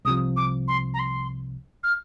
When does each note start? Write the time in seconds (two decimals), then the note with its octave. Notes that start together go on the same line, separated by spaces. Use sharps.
0.05 C2 C3 F3 D#6
0.36 D6
0.68 C6
0.94 A#5
0.99 C6
1.83 F6